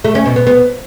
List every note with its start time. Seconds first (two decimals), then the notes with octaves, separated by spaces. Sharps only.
0.04 A3
0.15 C#4
0.26 B2
0.36 B3
0.47 B3